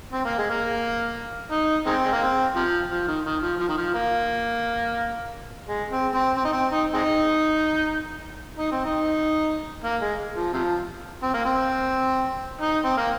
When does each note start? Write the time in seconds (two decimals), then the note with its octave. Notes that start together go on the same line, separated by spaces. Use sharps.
0.13 C4
0.25 A#3
0.38 G#3
0.50 A#3
1.52 D#4
1.86 D#3 G#3 C4
2.04 G#3
2.12 A#3
2.21 C4
2.56 C3 F3
2.90 F3
3.07 D#3
3.25 D#3
3.42 F3
3.60 F3
3.68 D#3
3.77 F3
3.94 A#3
5.68 G#3
5.90 C4
6.14 C4
6.37 C4
6.45 D#4
6.52 C4
6.71 D#4
6.94 G#3 C4 D#4
8.58 D#4
8.71 C4
8.85 D#4
9.83 A#3
10.01 G#3
10.36 F3
10.53 C3 F3
11.22 C4
11.34 A#3
11.45 C4
12.61 D#4
12.84 C4
12.97 A#3